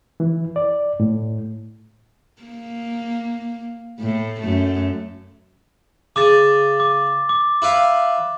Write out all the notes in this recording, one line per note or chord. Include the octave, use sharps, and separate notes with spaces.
E3
D5
A2
A#3
A2
F#2 A3
C#3 D6 A6
D6
D6
E4 B4 F5